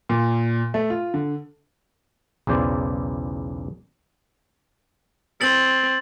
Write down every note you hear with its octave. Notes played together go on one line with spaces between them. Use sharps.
A#2
A3
F4
D3
B1 E2 C#3 C5 D5
C4 A6 F#7